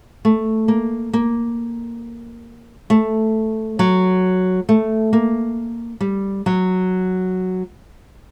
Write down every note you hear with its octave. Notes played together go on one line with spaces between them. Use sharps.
A3
A#3
A#3
A3
F#3
A3
A#3
G3
F#3